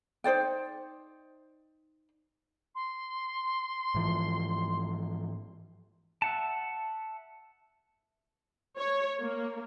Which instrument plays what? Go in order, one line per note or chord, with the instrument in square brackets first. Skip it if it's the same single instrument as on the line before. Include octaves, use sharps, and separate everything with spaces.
[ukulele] D#4 C5 D5 G5
[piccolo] C6
[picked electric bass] G#2 E3 F3
[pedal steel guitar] E5 F#5 A5
[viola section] C#5
A#3